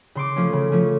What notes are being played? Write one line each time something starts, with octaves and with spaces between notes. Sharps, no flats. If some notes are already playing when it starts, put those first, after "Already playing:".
C#3 C6 D6
F3 A3 C#4
C#3
F3 A3 C#4